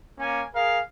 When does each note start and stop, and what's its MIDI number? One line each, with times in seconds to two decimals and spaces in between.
0.19 0.43 58
0.19 0.43 61
0.19 0.43 80
0.54 0.78 68
0.54 0.78 70
0.54 0.78 77